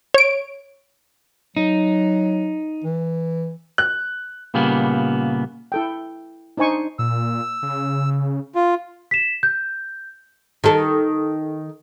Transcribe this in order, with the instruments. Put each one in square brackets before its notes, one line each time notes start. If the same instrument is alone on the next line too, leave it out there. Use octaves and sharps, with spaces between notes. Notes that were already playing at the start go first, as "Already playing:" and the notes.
[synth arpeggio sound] C#5 D7
[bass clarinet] F#3 [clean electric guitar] D#4
[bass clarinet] E3
[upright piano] F#6
[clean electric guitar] A#2 C#3 G3 A#3 B3
[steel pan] E4 A4 G5
D4 D#4 C5 G#5 C#6
[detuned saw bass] A#2 [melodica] E6
[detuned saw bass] C#3
[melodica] F4
[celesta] B6 E7
G6
[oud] D#3 A4